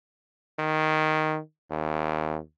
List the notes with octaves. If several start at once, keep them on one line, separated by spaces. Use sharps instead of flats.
D#3
D#2